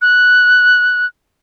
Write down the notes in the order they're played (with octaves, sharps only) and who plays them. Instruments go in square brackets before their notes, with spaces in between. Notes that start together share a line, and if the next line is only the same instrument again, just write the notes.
[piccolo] F#6